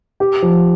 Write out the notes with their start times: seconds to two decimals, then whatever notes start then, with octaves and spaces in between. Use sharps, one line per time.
0.20 G4
0.42 F3